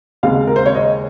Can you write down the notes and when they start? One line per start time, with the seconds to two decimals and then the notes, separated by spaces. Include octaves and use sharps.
0.23 D#2 C#3 G#3 C4 F5
0.47 A#4
0.56 C5
0.66 C#5
0.75 D#5